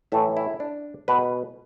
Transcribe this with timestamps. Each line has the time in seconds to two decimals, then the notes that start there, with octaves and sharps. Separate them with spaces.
0.12 A2 E3 A3 E5
0.37 E4
0.60 D4
1.08 B2 B4